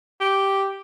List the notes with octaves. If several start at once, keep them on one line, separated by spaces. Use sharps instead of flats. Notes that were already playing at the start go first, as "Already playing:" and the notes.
G4